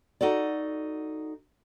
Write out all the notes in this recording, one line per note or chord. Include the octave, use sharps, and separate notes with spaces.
D#4 F#4 A4 D5